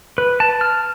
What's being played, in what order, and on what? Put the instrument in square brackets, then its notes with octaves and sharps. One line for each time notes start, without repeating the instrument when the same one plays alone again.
[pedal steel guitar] B4
A5
F6